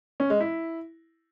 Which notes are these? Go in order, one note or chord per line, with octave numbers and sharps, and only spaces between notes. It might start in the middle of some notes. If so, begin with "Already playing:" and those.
C#4
G#3
E4